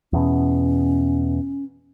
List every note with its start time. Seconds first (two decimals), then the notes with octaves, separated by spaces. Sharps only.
0.13 E2 B2 C#4